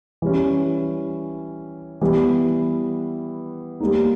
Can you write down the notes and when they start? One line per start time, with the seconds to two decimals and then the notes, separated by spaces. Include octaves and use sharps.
0.22 E3 G3 C#4
2.01 E3 G3 B3
3.80 G3 A#3 D#4